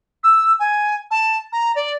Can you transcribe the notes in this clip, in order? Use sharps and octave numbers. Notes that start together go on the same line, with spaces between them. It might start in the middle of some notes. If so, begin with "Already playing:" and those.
E6
G#5
A5
A#5
D5